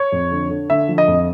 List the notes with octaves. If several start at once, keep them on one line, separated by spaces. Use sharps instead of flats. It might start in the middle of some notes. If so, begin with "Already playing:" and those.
Already playing: C#5
F2
D3
D3
D3 E5
F3
D#5
F2